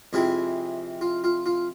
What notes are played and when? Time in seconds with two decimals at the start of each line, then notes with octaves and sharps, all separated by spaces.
0.13 F2 C3 G#3 C4 E4 G#4
1.01 F4
1.24 F4
1.46 F4